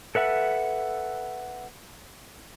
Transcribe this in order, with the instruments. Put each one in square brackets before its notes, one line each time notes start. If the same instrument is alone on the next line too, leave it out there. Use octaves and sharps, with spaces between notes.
[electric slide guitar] A4 B4 E5 F#5